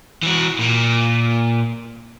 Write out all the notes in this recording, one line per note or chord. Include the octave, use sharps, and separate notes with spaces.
E3 F#4
A#2 A#3